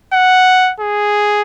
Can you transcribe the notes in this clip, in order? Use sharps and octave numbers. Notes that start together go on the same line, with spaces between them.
F#5
G#4